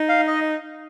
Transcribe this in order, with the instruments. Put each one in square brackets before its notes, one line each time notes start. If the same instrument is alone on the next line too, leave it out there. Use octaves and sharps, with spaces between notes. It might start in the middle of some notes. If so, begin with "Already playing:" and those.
Already playing: [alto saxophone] D#4
[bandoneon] F5
D#5